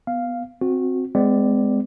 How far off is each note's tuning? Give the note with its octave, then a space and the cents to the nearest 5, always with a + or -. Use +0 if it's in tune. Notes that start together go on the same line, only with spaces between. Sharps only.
B3 +0 F5 +0
C4 +0 F#4 -20
G#3 +0 C4 -45 D5 +0